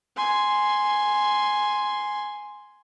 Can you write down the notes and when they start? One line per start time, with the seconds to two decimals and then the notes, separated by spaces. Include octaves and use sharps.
0.17 G#5 C6